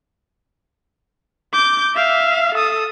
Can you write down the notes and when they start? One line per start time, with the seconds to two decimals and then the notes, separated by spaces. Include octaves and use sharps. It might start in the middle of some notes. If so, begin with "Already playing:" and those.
1.53 D6 G6
1.94 E5 F5
2.55 A4 D#6